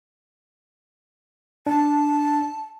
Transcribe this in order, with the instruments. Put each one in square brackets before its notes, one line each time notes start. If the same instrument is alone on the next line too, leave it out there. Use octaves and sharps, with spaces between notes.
[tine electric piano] D4 [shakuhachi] A5